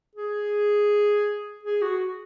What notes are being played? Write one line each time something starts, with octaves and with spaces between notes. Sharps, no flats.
G#4
G#4
F#4